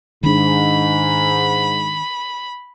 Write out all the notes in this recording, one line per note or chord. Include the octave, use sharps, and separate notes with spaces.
G#2 D#3 D4 B5